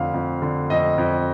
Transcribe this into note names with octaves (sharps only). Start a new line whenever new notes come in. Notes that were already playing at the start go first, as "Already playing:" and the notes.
Already playing: F2 D3 F5
F2
D3
F2 D#5
F2